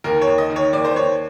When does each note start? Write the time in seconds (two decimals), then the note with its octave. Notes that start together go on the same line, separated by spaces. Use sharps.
0.04 D#2 A#4
0.22 C#5
0.28 D#2
0.38 D#5
0.50 D#3
0.56 C#5
0.73 D#2 D5
0.85 C5
0.96 D#2 C#5